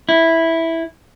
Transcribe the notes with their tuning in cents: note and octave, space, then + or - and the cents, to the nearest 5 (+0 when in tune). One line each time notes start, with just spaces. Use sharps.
E4 -5